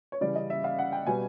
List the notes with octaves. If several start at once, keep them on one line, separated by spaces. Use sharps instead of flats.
C#5
C#3 E3 G3 D5
D#5
E5
F5
F#5
G5
B2 G3 G#5